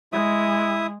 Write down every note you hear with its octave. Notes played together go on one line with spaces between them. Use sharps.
G#3 E4 E5 D#6